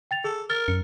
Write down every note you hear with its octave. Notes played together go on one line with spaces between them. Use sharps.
G5 A6 F7
G#4 A4
A#4 F6 A6
F#2 C#7